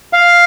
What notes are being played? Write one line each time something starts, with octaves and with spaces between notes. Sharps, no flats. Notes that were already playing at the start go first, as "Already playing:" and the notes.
F5